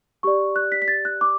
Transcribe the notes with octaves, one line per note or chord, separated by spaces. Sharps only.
G4 D5 C#6
F#6
B6
B6
A6
F#6
D6